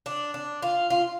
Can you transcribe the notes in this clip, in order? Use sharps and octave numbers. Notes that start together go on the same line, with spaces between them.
D4
D4
F4
F4